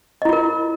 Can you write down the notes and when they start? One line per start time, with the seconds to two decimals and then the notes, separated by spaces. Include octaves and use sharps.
0.22 D#5
0.25 E4
0.29 F4
0.33 A#4